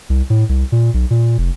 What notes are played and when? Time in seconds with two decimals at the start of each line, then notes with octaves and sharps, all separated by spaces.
0.10 C2
0.30 A2
0.49 C2
0.72 A#2
0.94 B1
1.10 A#2
1.38 F1